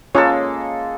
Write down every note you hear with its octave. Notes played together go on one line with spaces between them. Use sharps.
G#3 A#3 C#4 F4 A4 C#5